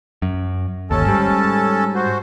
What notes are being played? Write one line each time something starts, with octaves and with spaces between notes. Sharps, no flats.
F#2
G1 D#2 C#4 A4 A5
G#2 G3
F#4 C5